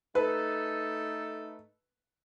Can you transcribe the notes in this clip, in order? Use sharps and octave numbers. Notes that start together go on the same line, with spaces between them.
A3 D#4 A4 B4